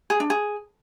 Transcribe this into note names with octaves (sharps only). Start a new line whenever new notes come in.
G#4
D4
G#4